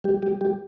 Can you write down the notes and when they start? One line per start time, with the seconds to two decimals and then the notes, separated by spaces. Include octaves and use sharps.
0.04 G3 G4
0.22 G3 G4
0.41 G3 G4